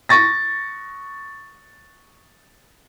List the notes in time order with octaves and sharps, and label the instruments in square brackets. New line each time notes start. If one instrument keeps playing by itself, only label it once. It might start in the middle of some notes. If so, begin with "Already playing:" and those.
[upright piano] C#6 A6 A#6